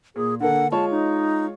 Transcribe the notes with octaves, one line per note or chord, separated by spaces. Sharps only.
A#2 G#4
D3 A#3 A4 F#5
G#3 F4 C#5 A5
D#4